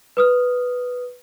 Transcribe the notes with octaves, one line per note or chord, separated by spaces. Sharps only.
B4 D#6 F6